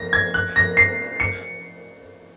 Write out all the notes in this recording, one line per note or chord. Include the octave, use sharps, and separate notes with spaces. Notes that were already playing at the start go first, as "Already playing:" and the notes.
Already playing: A#6
G#6
F#6
A#6
C7
C#7